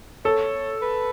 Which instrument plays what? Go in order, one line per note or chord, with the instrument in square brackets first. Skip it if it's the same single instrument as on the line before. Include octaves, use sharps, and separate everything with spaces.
[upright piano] A4 [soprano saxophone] C#5
[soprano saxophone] B4